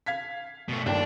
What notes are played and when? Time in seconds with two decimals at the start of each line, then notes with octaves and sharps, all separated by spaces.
0.06 F5 G#6 B6
0.69 B2 A3
0.86 G1 D#2 D4 G5